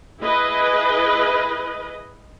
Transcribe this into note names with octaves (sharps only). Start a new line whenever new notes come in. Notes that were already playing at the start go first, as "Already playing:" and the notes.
E4 G#4 B4 D#5